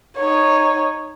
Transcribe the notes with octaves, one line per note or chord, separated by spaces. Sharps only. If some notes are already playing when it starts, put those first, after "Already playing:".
D#4 C#5